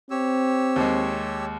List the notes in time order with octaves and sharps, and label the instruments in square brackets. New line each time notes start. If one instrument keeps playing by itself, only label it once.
[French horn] C4 [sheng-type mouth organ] G4 C#5 E6
[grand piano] D#2 G#3